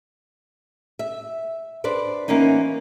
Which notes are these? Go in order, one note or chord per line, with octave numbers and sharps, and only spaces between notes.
E5
D4 B4 C5 D5
E3 A#3 B3 C#4 D#4